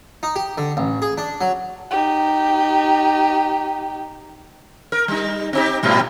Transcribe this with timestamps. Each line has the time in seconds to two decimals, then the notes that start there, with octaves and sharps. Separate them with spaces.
0.23 D#4
0.36 G4
0.58 D3
0.77 A1
1.02 G#4
1.18 D4
1.41 F#3
1.91 D#4 G4
4.92 A#4
5.08 G3 D#4
5.53 C4 D#4 G4
5.83 G#2 B2 G3